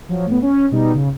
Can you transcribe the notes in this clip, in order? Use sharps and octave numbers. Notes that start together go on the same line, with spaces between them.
F3 F#3
A2 B3
C#4
B2 G3 D#4
C#3